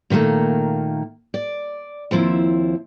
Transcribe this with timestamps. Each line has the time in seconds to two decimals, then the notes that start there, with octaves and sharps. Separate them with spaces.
0.10 A#2 D#3 G3 A3 A#3
1.34 D5
2.11 D#2 F3 C4 E4